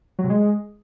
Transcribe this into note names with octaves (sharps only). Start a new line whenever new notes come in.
F#3
C3
G#3